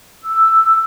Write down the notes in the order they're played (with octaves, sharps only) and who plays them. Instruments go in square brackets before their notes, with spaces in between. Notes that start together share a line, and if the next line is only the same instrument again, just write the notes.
[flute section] E6